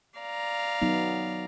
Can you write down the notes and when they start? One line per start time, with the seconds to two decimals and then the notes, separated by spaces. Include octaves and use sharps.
0.19 D5 F5 A#5
0.82 F#3 B3 D#4